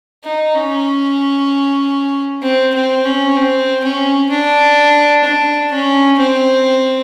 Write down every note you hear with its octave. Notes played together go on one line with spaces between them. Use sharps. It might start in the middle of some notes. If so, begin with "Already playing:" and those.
D#4
C#4
C4
C4
C#4
C4
C#4
D4
D4
C#4
C4